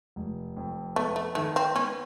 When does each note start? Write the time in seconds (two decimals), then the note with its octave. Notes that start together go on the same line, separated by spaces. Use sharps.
0.16 F1
0.57 F2
0.96 A3 B3
1.16 A3
1.35 D#3 A3
1.56 C4
1.76 B3 C#4